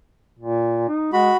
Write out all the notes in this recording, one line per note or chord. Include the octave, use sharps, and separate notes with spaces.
A#2
D#4
G#3 F#4 B5